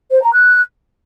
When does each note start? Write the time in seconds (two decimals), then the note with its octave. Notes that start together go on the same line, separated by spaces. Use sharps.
0.11 C5
0.22 A#5
0.34 F#6